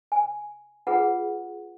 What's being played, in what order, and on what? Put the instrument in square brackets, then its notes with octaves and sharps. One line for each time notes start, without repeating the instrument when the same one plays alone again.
[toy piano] G#5
F4 G#4 B4 F#5